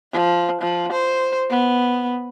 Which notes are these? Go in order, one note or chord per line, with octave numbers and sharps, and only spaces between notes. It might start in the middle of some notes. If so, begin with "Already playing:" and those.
F3
F3
C5
B3